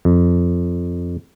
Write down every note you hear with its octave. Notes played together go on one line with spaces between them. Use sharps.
F2